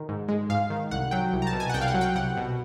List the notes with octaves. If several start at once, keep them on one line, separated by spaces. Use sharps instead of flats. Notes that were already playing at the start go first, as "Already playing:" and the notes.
Already playing: D#3
G#2
G#3
G#2 F5
D#3
C2 F#5
F#3 G5
C2
A#5
A5
B2
G#5
F#5
C2 G5
F5
F#5
F#3
G5
C2 F#5
B2